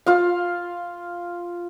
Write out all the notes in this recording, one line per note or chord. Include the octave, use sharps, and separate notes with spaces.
F4 F5